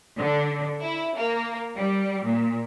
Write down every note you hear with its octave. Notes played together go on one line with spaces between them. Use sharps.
D3
E4
A#3
G3
A#2